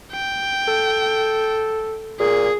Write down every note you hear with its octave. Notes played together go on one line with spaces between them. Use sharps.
G5
A4
A#2 G#4